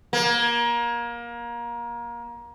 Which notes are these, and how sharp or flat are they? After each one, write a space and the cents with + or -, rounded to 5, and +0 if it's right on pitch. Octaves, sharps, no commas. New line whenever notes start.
A#3 +25